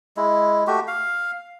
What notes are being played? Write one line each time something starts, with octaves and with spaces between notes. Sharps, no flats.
G#3 E4
A3 F#4 G4
F5